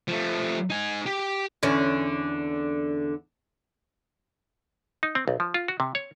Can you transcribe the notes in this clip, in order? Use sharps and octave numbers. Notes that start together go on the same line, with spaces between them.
F3 A3
D#4 G#5
G4
E2 D3 C#4
D#4
C4
B1
F3
F4
F#4
C3
C#5